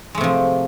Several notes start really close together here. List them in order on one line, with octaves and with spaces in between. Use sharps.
G#3 A3 C3 F3